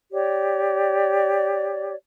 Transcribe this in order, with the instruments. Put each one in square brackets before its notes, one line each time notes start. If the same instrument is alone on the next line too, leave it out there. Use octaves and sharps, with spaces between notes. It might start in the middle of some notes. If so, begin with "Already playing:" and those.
[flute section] G4 C#5 D5